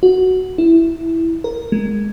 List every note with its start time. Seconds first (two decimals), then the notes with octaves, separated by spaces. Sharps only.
0.03 F#4
0.58 E4
1.44 A#4
1.72 G#3